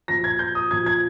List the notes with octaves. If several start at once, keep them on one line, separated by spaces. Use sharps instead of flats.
A#2 F3 A#6
G#6
G6
D#6
A#2 F3 G#6
G#6